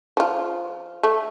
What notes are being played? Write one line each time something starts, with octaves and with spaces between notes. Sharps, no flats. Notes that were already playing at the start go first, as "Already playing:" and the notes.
F3 F4
A3